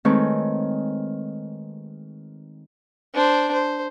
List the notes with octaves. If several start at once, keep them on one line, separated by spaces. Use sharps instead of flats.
D#3 G#3 A3 C4 B4 C#5
D4 C5
C5